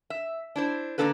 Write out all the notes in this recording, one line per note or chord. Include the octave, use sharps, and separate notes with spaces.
E5
D4 E4 C5
D3 A#3 D4 E4 A4 B4